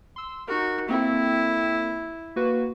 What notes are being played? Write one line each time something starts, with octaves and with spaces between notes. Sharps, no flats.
C6 E6
D#4 F#4 A#4
A#3 C4 E4 A4
A#3 F#4 B4